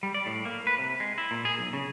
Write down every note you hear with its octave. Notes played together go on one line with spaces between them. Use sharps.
G3
D5
A2
A#3
B4
C3
G#3
E4
A#2
G#4
B1
C#3